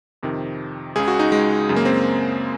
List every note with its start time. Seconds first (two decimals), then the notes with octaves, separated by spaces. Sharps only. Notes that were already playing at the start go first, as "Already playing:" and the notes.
0.23 F2 C3 D#3
0.95 C#2 C#3 G#4
1.08 F#4
1.19 D#4
1.32 G#3
1.69 F#2 C#3
1.76 A#3
1.85 C4